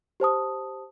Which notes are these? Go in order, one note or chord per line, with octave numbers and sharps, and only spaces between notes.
G4 C5 A5 D#6